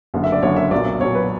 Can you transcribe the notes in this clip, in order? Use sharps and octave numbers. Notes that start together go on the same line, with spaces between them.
F#1 F#2 D3
E5
D5
F#1 F#2 D3 C#5
E5
B1 A#2 F#3 D5
B1 A#2 F#3 C#5
B4